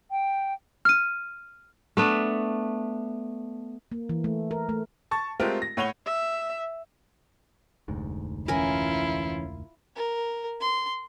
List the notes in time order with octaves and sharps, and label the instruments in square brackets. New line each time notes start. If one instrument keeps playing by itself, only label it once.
[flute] G5
[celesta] F6 D#7
[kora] A3 B3 D4
[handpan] A#3
E3
A3
A#4
A3
[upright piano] A5 C#6 A6
G#3 A3 C4 F4 G4 A#4
A#6
A2 C#5 F#5 D#7 F7 G7
[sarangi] E5
[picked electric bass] F1 D2 G#2
[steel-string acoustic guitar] E3 C#4 [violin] E4 F4 [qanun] A#4 G#5
[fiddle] A#4
C6